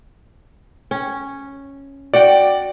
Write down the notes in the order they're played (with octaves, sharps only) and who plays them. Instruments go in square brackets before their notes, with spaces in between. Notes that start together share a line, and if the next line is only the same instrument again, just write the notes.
[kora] C#4
[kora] F#4 F#5 G5 [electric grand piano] D5